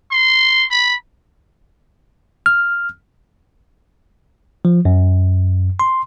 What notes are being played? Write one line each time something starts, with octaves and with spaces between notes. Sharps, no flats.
C6
B5
F6
F3
F#2
C6